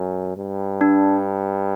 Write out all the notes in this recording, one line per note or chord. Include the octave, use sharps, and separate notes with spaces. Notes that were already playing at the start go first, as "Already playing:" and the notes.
Already playing: F#2
G2
D4